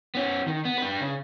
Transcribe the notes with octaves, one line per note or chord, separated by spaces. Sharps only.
B3 C#4
D#3
B3
D4 B4
C#3